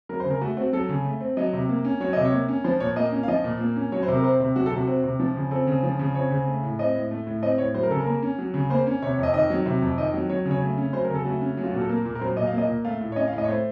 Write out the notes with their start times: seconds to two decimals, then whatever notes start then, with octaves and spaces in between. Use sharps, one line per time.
0.09 F#3 A#4
0.20 C5
0.25 C#3
0.30 A#4
0.41 A3 F#4
0.57 C4 F#4
0.73 F#3 A4
0.89 C#3
1.05 A3
1.21 C4
1.37 F#3 D#5
1.53 C3
1.69 A#3
1.85 C#4
2.00 F#3 C#5
2.13 C3 D#5
2.25 C#5
2.32 A#3
2.48 C#4
2.64 F3 C5
2.80 A#2 C#5
2.96 A#3 D#5
3.12 C#4
3.23 F5
3.28 F3 D#5
3.44 A#2
3.60 A#3
3.76 C#4
3.92 F#3 C#5
4.03 C5
4.08 C3
4.15 A#4
4.24 C4 C5
4.40 C3
4.56 F#3 F#4
4.66 A4
4.72 C3 F#4
4.87 C4
5.04 C3
5.20 F3
5.36 C#3
5.51 C4 A4
5.67 C#3
5.83 F3
5.99 C#3
6.15 C4 C#5
6.31 C#3
6.48 A3
6.63 A2
6.79 C4 D#5
6.95 A2
7.11 A3
7.27 A2
7.43 C4 D#5
7.58 A2 C#5
7.74 F#3 C5
7.83 A#4
7.91 C#3 A4
8.00 A#4
8.06 A#3
8.22 C#4
8.39 F#3
8.54 C#3
8.70 A#3 C5
8.87 C#4
9.02 C3 C#5
9.13 C#5
9.18 F2 D#5
9.34 D#3 D#5
9.50 F#3
9.66 C3
9.82 F2
9.98 D#3 D#5
10.14 F#3
10.29 F#3 C#5
10.46 C#3
10.51 C#5
10.62 A3
10.77 C#4
10.93 F#3 C5
11.04 A#4
11.10 C#3
11.15 A4
11.25 A3 F#4
11.41 C#4
11.57 F#3
11.64 F4
11.72 A#2 F#4
11.80 A4
11.89 A#3 A#4
12.05 A#2
12.15 A#4
12.21 F#3 C5
12.37 A#2 D#5
12.47 F5
12.53 A#3 D#5
12.68 A#2
12.85 A3 F5
13.01 A2
13.12 C#5
13.16 C#4 D#5
13.28 F5
13.33 A2
13.38 D#5
13.44 C#5
13.48 A3 C5